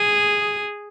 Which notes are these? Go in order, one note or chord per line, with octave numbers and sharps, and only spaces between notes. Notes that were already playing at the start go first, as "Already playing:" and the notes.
Already playing: G#4